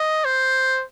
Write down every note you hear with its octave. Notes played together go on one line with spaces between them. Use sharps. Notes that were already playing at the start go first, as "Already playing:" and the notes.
Already playing: D#5
C5